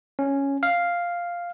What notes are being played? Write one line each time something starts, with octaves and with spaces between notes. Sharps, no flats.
C#4
F5